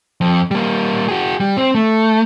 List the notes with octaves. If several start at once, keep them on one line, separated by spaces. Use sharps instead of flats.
F2
G3 A#3
F#4 G#4
G3
C4
A3